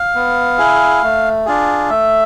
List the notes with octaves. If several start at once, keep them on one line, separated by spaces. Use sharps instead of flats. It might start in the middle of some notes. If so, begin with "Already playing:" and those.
Already playing: F5
B3
E4 G#4
A3
D4 F4 G#4
A3 E5